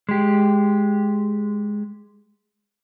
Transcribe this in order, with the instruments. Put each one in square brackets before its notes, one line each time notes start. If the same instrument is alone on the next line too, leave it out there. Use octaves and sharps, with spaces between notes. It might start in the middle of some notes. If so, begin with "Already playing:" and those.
[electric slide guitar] G#3 G4